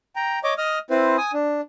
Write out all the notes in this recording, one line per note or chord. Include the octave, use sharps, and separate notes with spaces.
G5 A#5
C#5 D#5 D6
D#5 D#6 F6
C4 E4 B4 C5
G#5 D#6
D4